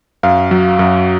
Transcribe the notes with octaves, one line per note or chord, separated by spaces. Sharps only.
F#2 F5
F#3
F#2